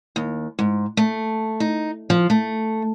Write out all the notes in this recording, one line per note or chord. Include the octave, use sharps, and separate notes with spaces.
D#2
G#2
A3
D#4
F3
A3